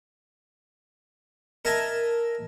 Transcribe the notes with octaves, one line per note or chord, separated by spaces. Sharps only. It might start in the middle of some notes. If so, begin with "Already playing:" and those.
A#4 D#5 E5 G#5 A5